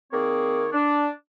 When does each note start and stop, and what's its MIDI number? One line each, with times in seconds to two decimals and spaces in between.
0.11 0.67 51
0.11 0.67 58
0.11 0.67 60
0.11 0.67 68
0.11 0.67 73
0.11 0.67 74
0.73 1.07 62